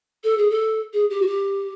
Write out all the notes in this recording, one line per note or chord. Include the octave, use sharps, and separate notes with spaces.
A4
G#4
A4
G#4
G4
F#4
G4